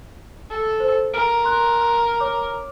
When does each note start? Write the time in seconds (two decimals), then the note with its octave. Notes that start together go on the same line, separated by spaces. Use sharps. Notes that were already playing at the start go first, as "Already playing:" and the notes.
0.50 A4
0.80 C5
1.13 A#4 D7
1.44 C6 F#6
2.20 C#5 D6